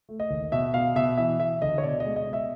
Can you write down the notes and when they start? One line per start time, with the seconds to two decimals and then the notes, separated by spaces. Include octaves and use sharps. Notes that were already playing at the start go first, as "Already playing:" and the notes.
0.09 A3
0.20 D#5
0.30 D#2
0.52 B2 E5
0.74 B2 F5
0.95 B2 E5
1.18 E3 E5
1.40 E3 E5
1.62 D2 D#5
1.78 C#5
1.83 B2 D5
2.00 G#3 D#5
2.16 D#5
2.27 B2
2.33 E5